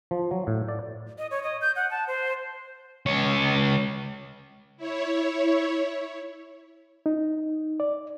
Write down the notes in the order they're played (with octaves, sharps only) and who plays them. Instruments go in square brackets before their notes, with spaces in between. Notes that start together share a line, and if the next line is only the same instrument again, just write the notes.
[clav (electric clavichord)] F3
F#3
A2
D5
[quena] D#5
C#5
D#5
G6
F#5
A5
C5
[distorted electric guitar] C#2 C#5
[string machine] E4 C#5
[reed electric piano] D#4
D5